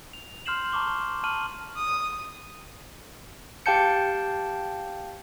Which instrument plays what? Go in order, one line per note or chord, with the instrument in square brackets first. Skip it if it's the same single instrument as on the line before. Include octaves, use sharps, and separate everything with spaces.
[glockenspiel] F7
C6 F6 G6 C7 E7 F#7
A5 A#5 C#6 D6 G7
A5 C#6 F6 D#7 F#7
[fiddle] D#6
[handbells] G4 F5 G5 A5 G6 C#7